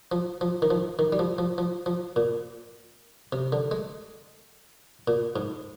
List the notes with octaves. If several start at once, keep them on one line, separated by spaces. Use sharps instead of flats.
F3
F3
D#3
F3
D#3
G3
F3
F3
F3
F3
A#2
C3
D3
G#3
A#2
G#2